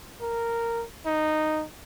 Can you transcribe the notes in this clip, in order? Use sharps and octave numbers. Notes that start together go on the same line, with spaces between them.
A#4
D#4